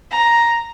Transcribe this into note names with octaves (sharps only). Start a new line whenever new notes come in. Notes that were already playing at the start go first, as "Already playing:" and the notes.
A#5